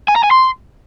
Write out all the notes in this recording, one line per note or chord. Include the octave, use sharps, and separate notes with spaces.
G#5
A#5
G#5
C6